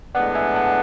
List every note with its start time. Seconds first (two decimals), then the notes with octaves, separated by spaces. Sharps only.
0.15 A2 G#3 B3 D4 D5 F#5
0.35 E5 G#5
0.55 F#5 A5